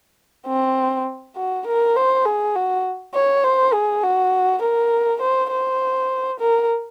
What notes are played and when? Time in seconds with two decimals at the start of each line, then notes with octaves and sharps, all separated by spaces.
0.47 C4
1.36 F#4
1.66 A#4
1.96 C5
2.26 G#4
2.55 F#4
3.15 C#5
3.44 C5
3.74 G#4
4.04 F#4
4.62 A#4
5.21 C5
5.51 C5
6.40 A#4